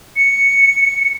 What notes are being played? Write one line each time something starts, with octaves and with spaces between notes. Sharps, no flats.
C#7